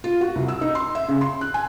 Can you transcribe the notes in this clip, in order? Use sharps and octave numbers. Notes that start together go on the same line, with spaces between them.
F4
F#4
C2
E6
D#4
C6
E5
C#3
C6
F#6
G#5